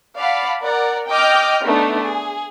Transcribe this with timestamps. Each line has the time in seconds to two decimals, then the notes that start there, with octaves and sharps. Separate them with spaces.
0.17 D5 F5 F#5 A5 B5
0.61 A#4 D5 F#5
1.08 D#5 G5 D6 F6 G6
1.64 A3 B3 D4 D#4
2.04 G#4